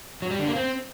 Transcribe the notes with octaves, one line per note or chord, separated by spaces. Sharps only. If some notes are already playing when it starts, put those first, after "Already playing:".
F#3
G3
D3
A#3
C4